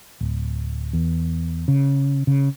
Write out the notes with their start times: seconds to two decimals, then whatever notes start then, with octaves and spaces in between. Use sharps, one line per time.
0.21 D1
0.93 E2
1.68 C#3
2.27 C#3